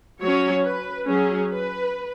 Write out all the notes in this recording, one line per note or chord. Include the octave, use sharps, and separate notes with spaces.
F#3 C#4 C#5
B4
F#3 C#4 G#4
B4